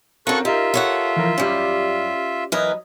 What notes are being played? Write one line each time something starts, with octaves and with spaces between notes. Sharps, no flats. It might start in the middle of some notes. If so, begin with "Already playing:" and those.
C4 C#4 F4 F#4 A4 A#4 C#6 F#6
D#4 F4 G4 A#4 E5
A4 C#5 F#5
E3 F3 A#4
F#2 G3 C#4 G4 D5
E3 F#3 A#4 B4 D#5